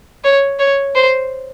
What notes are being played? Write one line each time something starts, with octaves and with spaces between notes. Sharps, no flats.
C#5
C#5
C5